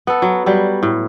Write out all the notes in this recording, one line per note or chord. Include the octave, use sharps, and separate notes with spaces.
B3 A4
F#3
F#3 G3
A2